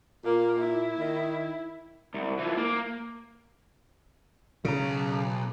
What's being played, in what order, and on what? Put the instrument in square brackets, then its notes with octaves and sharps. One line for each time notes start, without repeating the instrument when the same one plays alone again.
[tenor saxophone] A#2 [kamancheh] A#3
[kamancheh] E4
[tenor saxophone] D#3
[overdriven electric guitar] C2
E3 F3
A#3
[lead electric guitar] B1 A#5 [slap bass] C#3